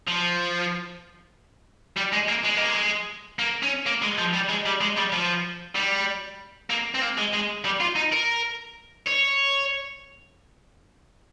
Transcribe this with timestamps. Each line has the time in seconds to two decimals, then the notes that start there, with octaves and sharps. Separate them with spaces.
0.08 F3
1.97 G3
2.13 G#3
2.28 A#3
2.44 G#3
2.57 A#3
2.69 G#3
3.39 A#3
3.63 C#4
3.86 A#3
4.02 G#3
4.18 F3
4.34 G3
4.49 G#3
4.66 G3
4.81 G#3
4.97 G3
5.12 F3
5.76 G3
6.70 A#3
6.94 C4
7.02 A#3
7.18 G#3
7.33 G#3
7.65 G3
7.80 F4
7.96 D#4
8.12 A#4
9.06 C#5